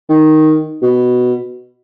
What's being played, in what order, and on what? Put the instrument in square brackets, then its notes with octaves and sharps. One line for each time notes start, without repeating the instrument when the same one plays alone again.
[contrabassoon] D#3
B2